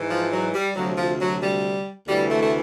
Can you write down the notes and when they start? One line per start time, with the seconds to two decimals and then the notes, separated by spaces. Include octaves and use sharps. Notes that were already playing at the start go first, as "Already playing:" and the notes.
Already playing: G#2 E3
0.09 F3
0.31 F#3
0.54 G3
0.76 D2 C3 F3 F#3
0.97 F3
1.20 F#3
1.42 G3
2.08 D2 C3 E3 G3
2.30 A3
2.43 A3